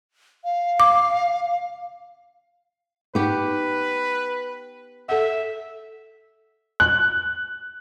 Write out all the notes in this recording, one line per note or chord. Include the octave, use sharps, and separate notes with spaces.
F5
D6
B3 D#4 G4 B4
A4 E5 F#5
F#6